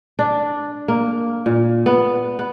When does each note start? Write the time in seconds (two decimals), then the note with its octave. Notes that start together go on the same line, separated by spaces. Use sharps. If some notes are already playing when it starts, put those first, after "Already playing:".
0.19 D4
0.88 A#3
1.46 A#2
1.86 B3
2.39 B3